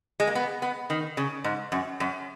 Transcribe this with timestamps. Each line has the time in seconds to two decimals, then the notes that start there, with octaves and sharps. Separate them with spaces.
0.20 G#3
0.27 A#3
0.35 B3
0.62 B3
0.90 D#3
1.17 C#3
1.44 G#2
1.72 F#2
2.00 F#2